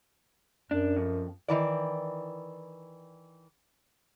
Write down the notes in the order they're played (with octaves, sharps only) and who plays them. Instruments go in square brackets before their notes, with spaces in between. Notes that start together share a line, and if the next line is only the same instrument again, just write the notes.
[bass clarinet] F#2 [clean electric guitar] D4
[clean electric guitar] F2
[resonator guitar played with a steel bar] D#3 E3 D5